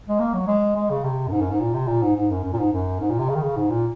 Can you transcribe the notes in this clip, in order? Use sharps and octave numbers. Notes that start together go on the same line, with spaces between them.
G#3
A#3
F#3
G#3
G#3
C#3
C3
F#2
G#2
F#2
G#2
A#2
C3
A#2
G#2
G#2
F#2
F#2
A#2
G#2
F#2
G#2
A#2
C3
C#3
D#3
C#3
G#2
A#2